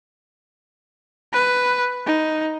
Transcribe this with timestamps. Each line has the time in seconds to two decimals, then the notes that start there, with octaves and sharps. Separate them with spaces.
1.33 B4
2.06 D#4